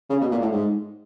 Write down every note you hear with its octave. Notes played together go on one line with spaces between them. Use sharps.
C#3
B2
A#2
A2
G#2